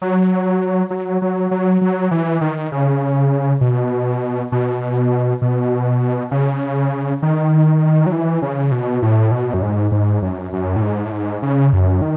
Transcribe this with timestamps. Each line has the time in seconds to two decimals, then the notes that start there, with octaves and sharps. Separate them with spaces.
0.02 F#3
0.90 F#3
1.22 F#3
1.51 F#3
1.81 F#3
2.11 E3
2.41 D#3
2.72 C#3
3.61 B2
4.52 B2
5.42 B2
6.31 C#3
7.22 D#3
8.06 F#3
8.12 E3
8.42 C#3
8.72 B2
9.02 A2
9.31 B2
9.54 F#2
9.62 G#2
9.92 G#2
10.22 F#2
10.53 F#2
10.76 A2
10.82 G#2
11.06 A2
11.12 G#2
11.42 C#3
11.73 F#2
12.02 D#3